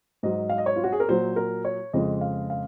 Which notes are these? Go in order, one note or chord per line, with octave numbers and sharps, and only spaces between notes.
G#2 F#3 D#5
F5
D#5
C#5
F4
F#4
G#4
A#4
A#2 F#3 C5
A#4
C#5
F2 C#3 F3 G#3 D#5
F5
F5